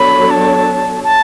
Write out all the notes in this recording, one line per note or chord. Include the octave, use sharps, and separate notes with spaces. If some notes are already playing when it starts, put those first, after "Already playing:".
Already playing: F#3 B3 D4 A4 C#5 B5
A5
A5